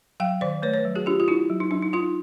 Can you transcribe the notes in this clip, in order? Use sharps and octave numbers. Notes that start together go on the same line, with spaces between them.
F#3 F5 G5
D#3 C5 D5
A3 B4 C#5
B4 C#5
F#3
F#4 G#4
D4 F4 G4
F4
D4 E4 F#4
F#3
D#4
F#3 D4
D#4
D4 D#4 F4